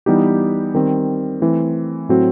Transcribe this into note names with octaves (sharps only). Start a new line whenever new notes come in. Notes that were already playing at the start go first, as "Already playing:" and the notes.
E3 G3 B3 D#4 G4
D#3 G3 C4
E3 A3 C4
A2 F#3 C4 F#4